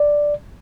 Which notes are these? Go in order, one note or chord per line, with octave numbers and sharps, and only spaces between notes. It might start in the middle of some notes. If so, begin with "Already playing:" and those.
Already playing: D5